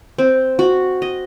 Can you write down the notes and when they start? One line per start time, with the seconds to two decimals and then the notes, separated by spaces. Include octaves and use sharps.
0.18 C4
0.59 F#4
1.02 D#5